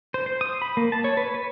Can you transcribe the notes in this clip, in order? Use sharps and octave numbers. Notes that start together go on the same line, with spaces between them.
C5
C5
D#6
B5
A#3
A5
C#5
B4
B4